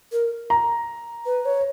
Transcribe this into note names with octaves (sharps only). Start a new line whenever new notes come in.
A#4
A#5
B4
C#5